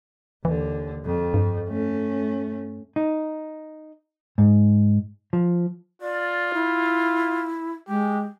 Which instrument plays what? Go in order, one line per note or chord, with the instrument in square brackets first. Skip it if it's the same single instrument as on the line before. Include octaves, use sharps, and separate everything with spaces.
[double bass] D#2 D3 [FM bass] E3
[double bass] F2
[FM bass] G2
[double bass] A3 C#4
[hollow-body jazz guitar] D#4
G#2
F3
[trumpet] F4 [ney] D5
[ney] E4
[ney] G#3 [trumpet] G4